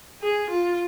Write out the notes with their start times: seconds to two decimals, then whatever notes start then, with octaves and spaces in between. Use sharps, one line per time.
0.22 G#4
0.50 F4